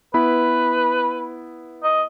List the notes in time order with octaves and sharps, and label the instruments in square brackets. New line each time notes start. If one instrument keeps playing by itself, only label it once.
[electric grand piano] B3 E4 B5 [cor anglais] B4
[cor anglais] D#5